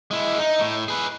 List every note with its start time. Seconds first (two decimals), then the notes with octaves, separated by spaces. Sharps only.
0.11 G#3 E4
0.39 D#4
0.60 A2
0.88 G#4 B4